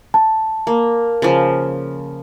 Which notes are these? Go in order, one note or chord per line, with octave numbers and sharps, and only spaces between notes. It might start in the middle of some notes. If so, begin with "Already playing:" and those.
A5
A#3
C#3 F3